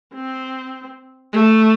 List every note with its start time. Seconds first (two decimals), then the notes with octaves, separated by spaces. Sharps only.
0.14 C4
1.33 A3